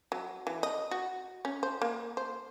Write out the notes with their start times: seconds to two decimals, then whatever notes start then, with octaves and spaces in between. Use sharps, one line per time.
0.12 F#3
0.47 E3
0.63 D#5
0.91 F#4
1.45 C#4
1.63 C5
1.82 A#3
2.17 C5